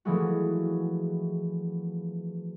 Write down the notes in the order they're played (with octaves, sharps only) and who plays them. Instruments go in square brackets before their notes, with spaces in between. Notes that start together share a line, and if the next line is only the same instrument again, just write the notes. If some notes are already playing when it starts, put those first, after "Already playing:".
[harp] E3 F3 G#3 A3 B3 F#4